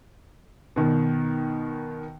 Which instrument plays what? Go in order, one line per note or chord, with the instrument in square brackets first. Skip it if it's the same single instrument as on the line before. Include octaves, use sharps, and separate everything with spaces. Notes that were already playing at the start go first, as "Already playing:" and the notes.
[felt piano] B2 D#3